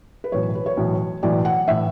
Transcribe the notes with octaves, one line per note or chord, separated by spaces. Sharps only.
B4
B1 A2 E3 C#5
B4
C#5
B1 A2 E3
B1 A2 E3 D5
F#5
A2 E3 E5